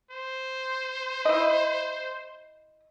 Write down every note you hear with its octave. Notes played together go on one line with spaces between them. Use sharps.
C5
E4 D#5